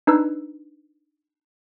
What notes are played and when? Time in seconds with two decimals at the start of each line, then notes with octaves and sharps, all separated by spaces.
0.07 D4 D#4 B4 E6